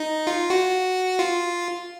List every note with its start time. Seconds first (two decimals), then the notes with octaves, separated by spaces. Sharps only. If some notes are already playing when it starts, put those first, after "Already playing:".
Already playing: D#4
0.27 F4
0.50 F#4
1.19 F4